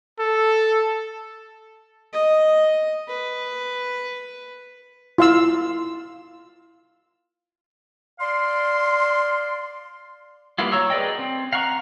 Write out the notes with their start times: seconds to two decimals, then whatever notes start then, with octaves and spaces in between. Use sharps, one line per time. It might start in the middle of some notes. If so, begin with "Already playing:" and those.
0.19 A4
2.13 D#5
3.08 B4
5.18 E4 F4 F5 E6
8.20 D5 F5 C6
10.58 G3 A#3 B3 E4 F4
10.72 F#3 C#5 A#5 C#6 E6
10.90 G#4 B4 D5 D#5 G5
11.19 C4
11.53 F5 F#5 A#5 C#6